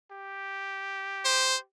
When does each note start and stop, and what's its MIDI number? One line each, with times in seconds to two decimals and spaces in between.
0.11 1.64 67
1.25 1.56 72